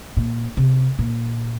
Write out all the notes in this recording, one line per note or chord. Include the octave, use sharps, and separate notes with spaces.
A#2
C3
A#2